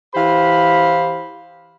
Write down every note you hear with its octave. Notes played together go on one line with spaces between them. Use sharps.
E3 G4 C5 F5 B5